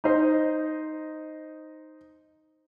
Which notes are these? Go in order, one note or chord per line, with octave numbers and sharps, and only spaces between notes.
D#4 C5